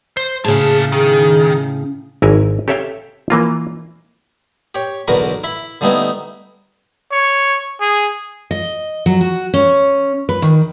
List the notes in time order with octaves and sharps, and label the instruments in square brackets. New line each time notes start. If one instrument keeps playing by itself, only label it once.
[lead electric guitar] C5
[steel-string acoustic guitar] A2 C#3 [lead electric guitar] A#3 A5 [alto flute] G#4
[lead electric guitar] D#3 [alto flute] G#4
[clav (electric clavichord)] G#1 E4 A#4 G#5
G4 A4 C#5 E5 F5 G5
E3 A#3 F4
[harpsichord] G4 C#5
B1 E2 D3 F#4 A#4 B4
E4 B5
D3 G3 A3 B3 D#4 E4
[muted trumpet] C#5
G#4
[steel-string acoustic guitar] D#5
F#3
F#4
C#4
B4
D#3